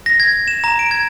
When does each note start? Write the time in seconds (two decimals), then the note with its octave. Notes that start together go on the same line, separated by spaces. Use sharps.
0.06 A#6
0.20 G#6
0.48 E7
0.64 A#5
0.79 D7
0.91 G#6